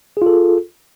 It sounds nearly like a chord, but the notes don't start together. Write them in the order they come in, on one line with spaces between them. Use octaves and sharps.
G#4 F4 A4